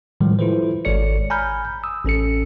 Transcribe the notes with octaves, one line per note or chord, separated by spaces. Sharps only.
A2 D#3 F3 G3 G#3
E4 F4 A4 B4 C5
G#1 G#3 A4 C#5 D5 C#7
G#5 A#5 B5 F6 G6
D#6 E6
A1 C#4 A4 C#7